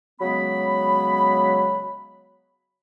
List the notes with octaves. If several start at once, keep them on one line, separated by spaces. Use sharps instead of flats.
C#3 F#3 G#3 B3 B5